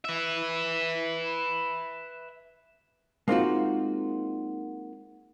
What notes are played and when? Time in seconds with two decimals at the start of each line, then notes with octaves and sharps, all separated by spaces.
0.05 B4 E5
3.28 G#3 A#3 C4 D#4 F4 F#4